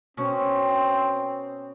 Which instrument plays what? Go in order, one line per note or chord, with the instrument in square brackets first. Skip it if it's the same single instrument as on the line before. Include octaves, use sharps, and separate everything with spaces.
[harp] B2 C#4 [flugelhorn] C4